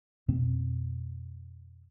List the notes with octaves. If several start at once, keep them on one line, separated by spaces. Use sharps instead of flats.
F2 B2 A#3 C4